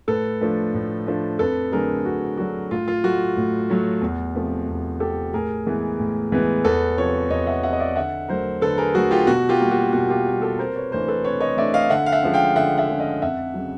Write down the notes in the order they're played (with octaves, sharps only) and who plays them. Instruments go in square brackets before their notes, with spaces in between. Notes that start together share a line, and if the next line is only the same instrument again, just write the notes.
[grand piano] A2 A4 B4
F3 A3 D4
A2
F3 A3 D4
F2 A4 B4
D3 F#3 A3 D4 G#4 A#4
F2 F#4
D3 F#3 A3 D4 F#4
A2 F4
F4
F#3 A3 F#4
A2
F#3 A3
E2
C3 F3 A3
E2
C3 F3 A3 G4 A4
A2 G#4 A#4
E3 G#3 B3
A2
E3 G#3 B3
E2 A4 B4
C3 F3 B4 C#5
E2 C#5 D#5
E5 F#5
C3 F3 E5 F#5
D#5
D5 E5
D3 E5 F#5
F#3 A3 A#4 C5
D3 A4 B4
G#4 A#4
F#3 A3 F#4 G#4
F4 G4
B2 F#4
F4 G4
G3 A#3
F#4
B2 F#4
F4 G4
G3 A#3
G4 A4
C3 A#4 C5
B4 C#5
E3 A3 D4 A#4 C5
A4 B4
C3 B4 C#5
C#5 D#5
E3 A3 D4 D5 E5
D#5 F5
D3 E5 F#5
F5
E5 F#5
F3 G#3 C#4
F5 G5
D3 E5 F#5
E5 F#5
F3 G#3 C#4
D#5 F5
F2 E5 F#5
C#3 F#3